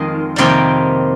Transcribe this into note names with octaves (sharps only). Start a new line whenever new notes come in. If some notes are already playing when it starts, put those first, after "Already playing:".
Already playing: F2 D#3 G#3 D#5
F2 C3 D#3 G3 A#3 G5